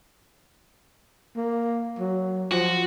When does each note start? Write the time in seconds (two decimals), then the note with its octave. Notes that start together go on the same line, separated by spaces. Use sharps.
1.36 A#3
1.99 F#3
2.52 F3 F#4